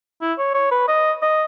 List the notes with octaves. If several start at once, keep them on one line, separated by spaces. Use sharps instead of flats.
E4
C#5
C#5
B4
D#5
D#5